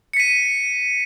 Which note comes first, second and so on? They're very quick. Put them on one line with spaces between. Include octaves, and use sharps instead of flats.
C#7 B6 D#7